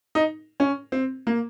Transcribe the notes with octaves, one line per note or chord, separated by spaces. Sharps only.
D#4
C#4
C4
A#3